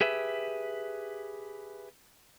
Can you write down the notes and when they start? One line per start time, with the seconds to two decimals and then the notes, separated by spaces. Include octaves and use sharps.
0.01 G4 G#4 B4 E5